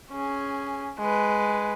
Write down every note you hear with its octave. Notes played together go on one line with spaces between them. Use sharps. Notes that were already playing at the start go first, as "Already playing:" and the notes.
C#4 G#4
G#3 B4